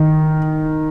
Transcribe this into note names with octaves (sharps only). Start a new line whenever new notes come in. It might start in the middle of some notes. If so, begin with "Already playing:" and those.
Already playing: D#3